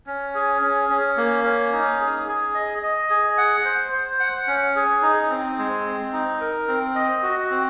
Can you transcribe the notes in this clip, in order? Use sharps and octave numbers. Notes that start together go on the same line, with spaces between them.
C#4
G#4
C#4
C#4
A#3
C#4
D#4
G#4
G#4
D#5
D#5
G#4
F#5
C5
C5
F#5
C#4
G#4
D#4
C4
G#3
C4
D#4
A#4
C4
D#5
F#4
C4